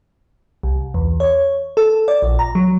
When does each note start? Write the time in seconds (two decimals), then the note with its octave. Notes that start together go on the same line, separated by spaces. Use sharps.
0.63 C2
0.94 E2
1.20 C#5
1.77 A4
2.08 D5
2.22 A#1
2.39 A#5
2.55 F#3